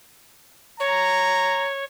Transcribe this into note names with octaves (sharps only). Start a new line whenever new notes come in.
C#5 A#5